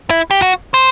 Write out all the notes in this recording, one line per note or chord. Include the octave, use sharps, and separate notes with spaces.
E4
G4
F#4
C5